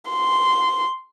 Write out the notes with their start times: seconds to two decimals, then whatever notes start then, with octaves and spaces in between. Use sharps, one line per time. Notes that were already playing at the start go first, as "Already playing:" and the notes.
0.10 C6